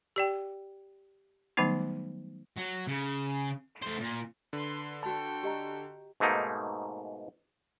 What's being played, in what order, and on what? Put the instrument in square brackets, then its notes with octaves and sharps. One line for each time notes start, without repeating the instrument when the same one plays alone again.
[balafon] G4 D5 G5
D#3 F#3 G3 A3 B3 D#4
[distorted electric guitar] F#3
C#3
A3 C5
A#2
[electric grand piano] D3 [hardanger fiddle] B4 C6
[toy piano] F#4 B5 [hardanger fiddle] G5 C#6 [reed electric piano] A5
[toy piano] G4 D#5 A#5
[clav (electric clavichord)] G#2 B2 A3 A#3 D#4